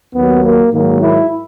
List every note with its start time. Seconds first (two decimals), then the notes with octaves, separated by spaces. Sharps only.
0.15 D#2 D#3 F#3 B3
0.43 A#3
0.72 G#2 D#3 F#3 A#3
1.01 E4